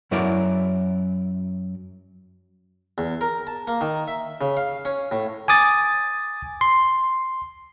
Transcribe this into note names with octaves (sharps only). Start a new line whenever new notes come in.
F#2 F#3 E4 A#4 D5
E2
A#4
A5
A#3
D#3
E5
C#3
F5
C#4
A2
G#5 D6 D#6 A6
C6